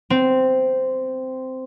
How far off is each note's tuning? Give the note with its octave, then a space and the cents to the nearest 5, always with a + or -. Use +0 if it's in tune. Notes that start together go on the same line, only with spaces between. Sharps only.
C4 -10